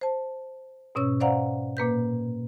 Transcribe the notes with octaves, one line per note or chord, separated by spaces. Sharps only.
C5 A5
G#2 B2 C#4 C#5 E6
C5 D5 F5 F#5 A#5
A#2 A#3 B4 G6